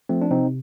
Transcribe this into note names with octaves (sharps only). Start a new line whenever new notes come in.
F3 A3 C4
D4
C3 C4 D#4